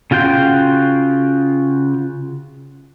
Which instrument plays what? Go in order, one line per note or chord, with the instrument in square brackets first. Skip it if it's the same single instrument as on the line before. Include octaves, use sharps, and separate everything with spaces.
[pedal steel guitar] C#3 F4 F#4 G5 C6